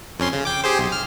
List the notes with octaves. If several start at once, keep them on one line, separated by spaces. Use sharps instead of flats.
F2 C#4 C6
C#3
G5 D6
G4 G#4 C5
B1
F6